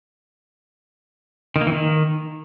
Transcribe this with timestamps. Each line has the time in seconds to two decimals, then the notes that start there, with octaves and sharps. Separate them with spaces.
1.56 D#3
1.61 A#3
1.67 E3
1.72 D#3